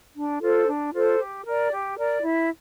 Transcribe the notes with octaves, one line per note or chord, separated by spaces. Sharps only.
D4
F4 A4 C5
D4
F4 A4 C5
G4
A#4 D5
G4
A#4 D5
E4